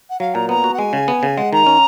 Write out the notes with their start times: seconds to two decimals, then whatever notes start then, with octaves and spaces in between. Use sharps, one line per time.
0.10 F#5
0.20 F#3 F5
0.34 A#2 A#5
0.49 B3 A#5
0.64 F#4
0.74 F#5
0.79 G#3 G#5
0.93 C#3
1.08 B3
1.23 C#3
1.37 G#3 F#5
1.53 D#3 A#5
1.67 C#4